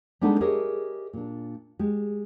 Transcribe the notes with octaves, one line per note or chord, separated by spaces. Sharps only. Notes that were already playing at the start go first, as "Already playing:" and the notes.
G3 G#3 B3 D4 D#4 A4
G4 G#4 A#4 C#5 D#5 E5
A#2 D4
G#3 G4